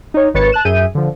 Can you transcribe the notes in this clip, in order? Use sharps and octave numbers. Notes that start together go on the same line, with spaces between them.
D#4 C#5
G#1 D#3 B4 C#5 A6 C#7
A5 F#6 E7
F#2 G#4 E5 G6 D#7
D3 F3